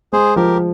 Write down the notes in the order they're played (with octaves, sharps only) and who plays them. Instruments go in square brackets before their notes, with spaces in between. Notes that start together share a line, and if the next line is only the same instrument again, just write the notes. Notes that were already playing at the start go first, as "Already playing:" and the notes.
[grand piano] G#3 [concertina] G#4 C5
[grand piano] F3 [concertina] G4 A#4